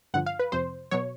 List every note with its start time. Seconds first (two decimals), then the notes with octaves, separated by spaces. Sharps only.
0.14 G2 D3 F3 F#5
0.26 F5
0.39 B4
0.52 F2 C3 F3 C5
0.91 B2 F#3 C#5